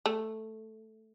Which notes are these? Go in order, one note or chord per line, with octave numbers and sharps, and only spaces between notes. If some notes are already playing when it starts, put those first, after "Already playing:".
A3